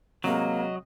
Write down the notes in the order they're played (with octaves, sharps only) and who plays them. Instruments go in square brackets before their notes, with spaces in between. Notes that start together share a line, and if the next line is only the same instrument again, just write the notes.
[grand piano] C3 G#3 C4 [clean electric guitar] F#3 [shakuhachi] A#3 [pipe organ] D#5